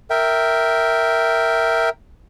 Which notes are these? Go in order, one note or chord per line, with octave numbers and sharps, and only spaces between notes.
A#4 E5 G5